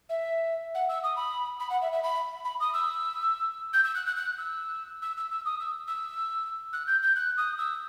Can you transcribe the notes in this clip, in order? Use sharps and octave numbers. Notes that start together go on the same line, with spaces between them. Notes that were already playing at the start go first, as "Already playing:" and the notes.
E5
F#5
E6
D#6
B5
B5
F#5
E5
E5
B5
B5
D#6
E6
G6
E6
F#6
F#6
F#6
E6
E6
E6
E6
D#6
E6
E6
F#6
G6
G6
F#6
D#6
E6